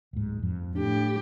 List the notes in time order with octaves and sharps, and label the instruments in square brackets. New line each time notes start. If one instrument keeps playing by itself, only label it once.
[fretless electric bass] D1 G#2
F2
[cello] A2 G4 [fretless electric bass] D4